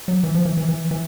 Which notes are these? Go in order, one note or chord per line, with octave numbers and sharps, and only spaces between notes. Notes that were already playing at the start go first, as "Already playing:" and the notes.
F#3
E3
F3
E3
E3
E3
E3